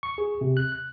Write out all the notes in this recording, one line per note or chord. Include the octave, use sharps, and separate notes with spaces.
C#6
G#4
C3
F#6
F#6